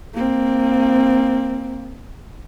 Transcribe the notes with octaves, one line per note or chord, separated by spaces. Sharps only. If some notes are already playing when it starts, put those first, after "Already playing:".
A#3 C4